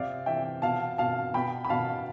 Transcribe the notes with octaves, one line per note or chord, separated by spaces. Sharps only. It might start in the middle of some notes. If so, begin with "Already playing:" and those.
Already playing: C3 D5 F5
E3 E5 G5
B2 F5 A5
B2 F5 A5
B2 G5 B5
B5
B2 F5 A5